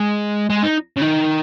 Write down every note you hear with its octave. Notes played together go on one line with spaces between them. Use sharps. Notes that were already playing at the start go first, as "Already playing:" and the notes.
Already playing: G#3
G#3
D#4
C#3
D#3